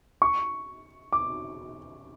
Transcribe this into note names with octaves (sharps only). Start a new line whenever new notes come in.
C#6
D6